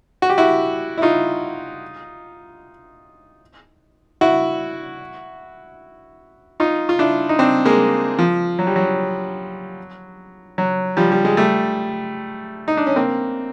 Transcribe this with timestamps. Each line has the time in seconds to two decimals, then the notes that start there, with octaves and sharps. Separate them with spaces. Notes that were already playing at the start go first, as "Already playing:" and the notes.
0.22 F#4
0.30 G4
0.38 E4 F#4
0.98 E4
1.02 D#4 F4
4.21 E4 F#4
6.60 D#4 F4
6.89 F4
6.99 D4 E4
7.29 D#4
7.39 C4 D4
7.65 G#3 A#3
8.19 F3
8.59 F#3
8.67 G3
8.76 F#3
10.58 F#3
10.97 F3 G3
11.12 G3
11.25 G#3
11.37 G3 A3
12.68 D#4
12.77 D4
12.87 C#4
12.96 A#3 C4